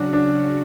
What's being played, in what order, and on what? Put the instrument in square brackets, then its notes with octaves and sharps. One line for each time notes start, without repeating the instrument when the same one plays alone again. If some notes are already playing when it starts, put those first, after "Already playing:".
Already playing: [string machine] C#3 F#3 C#4 F#4 [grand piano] D4
[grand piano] D4